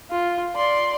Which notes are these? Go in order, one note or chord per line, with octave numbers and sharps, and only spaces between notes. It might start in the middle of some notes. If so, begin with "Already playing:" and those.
F4
D5 C6